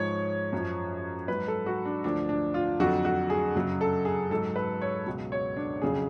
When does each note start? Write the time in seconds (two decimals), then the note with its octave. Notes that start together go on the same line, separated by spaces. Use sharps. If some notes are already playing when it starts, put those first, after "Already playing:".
Already playing: G#2 F3 C#5
0.53 F#2 F3
1.28 G#2 F#3 B4
1.48 A4
1.66 F#4
1.85 D4
2.04 D2 D3 F3 D4
2.29 D4
2.54 F4
2.80 F2 D3 F#3 F#4
3.05 F#4
3.30 G#4
3.55 F#2 C#3 F#3
3.81 A4
4.05 G#4
4.31 G#2 F#3 A4
4.56 B4
4.82 C#5
5.07 C#2 B2 F#3
5.32 C#5
5.56 D4
5.82 F2 C#3 F#3 G#4